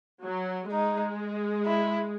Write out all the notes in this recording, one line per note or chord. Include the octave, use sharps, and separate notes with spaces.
F#3
G#3 D#4
E4